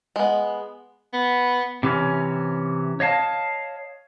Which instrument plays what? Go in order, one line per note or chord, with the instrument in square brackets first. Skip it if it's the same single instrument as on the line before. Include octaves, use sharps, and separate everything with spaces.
[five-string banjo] G#3 B3
[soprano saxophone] B3
[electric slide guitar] C3 E3 C#4
C#5 D#5 F5 A5